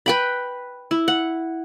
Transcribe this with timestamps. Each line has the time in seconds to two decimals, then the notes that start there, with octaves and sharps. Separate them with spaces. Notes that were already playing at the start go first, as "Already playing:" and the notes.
0.06 B4 G5 B5
0.91 E4
1.08 F#5